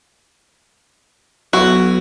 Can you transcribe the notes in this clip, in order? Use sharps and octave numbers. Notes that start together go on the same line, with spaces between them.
B1 E4 F#4